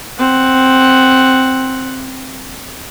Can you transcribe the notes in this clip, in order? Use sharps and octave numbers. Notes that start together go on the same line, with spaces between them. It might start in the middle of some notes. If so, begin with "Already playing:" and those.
C4 F#5